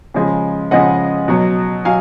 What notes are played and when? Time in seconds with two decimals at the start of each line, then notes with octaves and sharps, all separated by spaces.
0.14 C#3 F3 G#3
0.71 C#3 F3 G#3 D#5 F#5
1.28 B2 F#3
1.85 F#3 F5 G#5